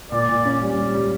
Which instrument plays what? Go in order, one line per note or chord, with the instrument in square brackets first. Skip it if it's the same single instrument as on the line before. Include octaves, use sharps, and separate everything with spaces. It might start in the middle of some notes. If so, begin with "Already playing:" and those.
[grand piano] A#2 [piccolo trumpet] D5
[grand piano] A#2
C#4
G3
G3
G3